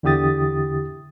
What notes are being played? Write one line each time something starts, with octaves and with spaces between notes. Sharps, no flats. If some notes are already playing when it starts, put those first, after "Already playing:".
E2 D3 E4 G4 D#6 A6